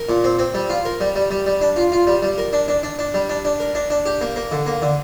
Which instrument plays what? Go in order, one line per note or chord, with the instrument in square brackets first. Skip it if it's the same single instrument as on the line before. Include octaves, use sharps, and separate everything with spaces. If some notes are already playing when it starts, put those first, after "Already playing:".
Already playing: [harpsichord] A#4
A#2
C4
C4
G3
F4
A#4
G3
G3
G3
G3
D4
F4
F4
G3
G3
A#4
D4
D4
D4
D4
G3
D4
D4
A#4
D4
D4
G4
A#3
A#3
D3
A#3
D3